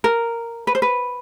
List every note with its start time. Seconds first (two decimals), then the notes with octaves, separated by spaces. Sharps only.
0.04 A#4
0.67 B4
0.75 C5
0.82 B4